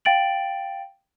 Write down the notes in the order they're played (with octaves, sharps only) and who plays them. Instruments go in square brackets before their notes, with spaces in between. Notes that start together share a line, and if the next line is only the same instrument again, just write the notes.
[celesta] F5 G5 A6 D7 F#7